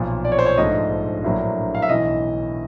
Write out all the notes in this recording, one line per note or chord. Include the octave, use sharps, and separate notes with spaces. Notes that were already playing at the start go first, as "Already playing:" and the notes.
Already playing: B1 A#2 F3
D5
C#5
C5
C#5
A#1 G#2 F3 A3 D4 D#5
A#1 A2 F#3 A#3 D4
F5
E5
B1 A2 E3 D#5